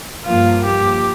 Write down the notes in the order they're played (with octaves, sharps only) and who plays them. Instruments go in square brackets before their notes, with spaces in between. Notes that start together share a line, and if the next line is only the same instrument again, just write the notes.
[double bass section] G2 F3 A#3 [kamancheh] F4
[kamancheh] G4